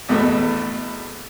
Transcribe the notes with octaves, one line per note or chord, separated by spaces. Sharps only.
A1 E2 B2 A3